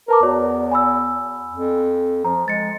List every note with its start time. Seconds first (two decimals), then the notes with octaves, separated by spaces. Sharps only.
0.08 A#4 B4 A5 D6
0.23 E2 F#4 C#5 D5
0.71 G#5 B5 E6
1.53 F2
2.25 F3 A#5
2.48 G#3 A6 C#7